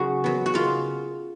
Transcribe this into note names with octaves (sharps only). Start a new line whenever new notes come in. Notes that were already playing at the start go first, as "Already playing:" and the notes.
Already playing: C#3 F#3 F#4
F#3 B3
F#4
C#3 F4